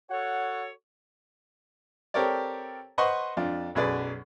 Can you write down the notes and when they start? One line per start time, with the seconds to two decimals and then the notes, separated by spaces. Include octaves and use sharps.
0.10 F#4 A4 C#5 F#5
2.14 C4 G4 A4 A#4 C#5 D5
2.98 B4 C5 D#5 F#5 C6 C#6
3.37 F2 D4 F4
3.75 B1 F#2 G#4 B4 D5